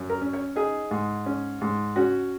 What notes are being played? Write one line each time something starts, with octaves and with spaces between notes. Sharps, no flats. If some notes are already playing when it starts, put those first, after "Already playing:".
Already playing: F#2
A#4
C#4
C#5
D#4 G#4
G#2
C#4
G#2
C#4 F#4